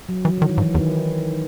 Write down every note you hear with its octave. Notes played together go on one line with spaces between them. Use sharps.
F#3
E3 F#3
D#3 E3
D#3
G#2
E3
E2 D#3